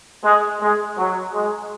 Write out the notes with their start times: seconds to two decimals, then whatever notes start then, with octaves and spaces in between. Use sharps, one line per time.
0.23 G#3
0.60 G#3
0.98 F#3
1.34 G#3